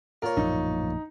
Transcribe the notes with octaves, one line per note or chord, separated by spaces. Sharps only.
A#2 A#4 C#5
A#1 F#2 A2 D#4